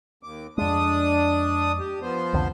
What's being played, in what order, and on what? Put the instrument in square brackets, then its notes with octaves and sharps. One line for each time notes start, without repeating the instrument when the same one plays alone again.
[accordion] D#2 D6
[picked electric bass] F2 G#3 [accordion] D4 D#6
[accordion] G4
F3 B3 C5
[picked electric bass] C2 F2 D3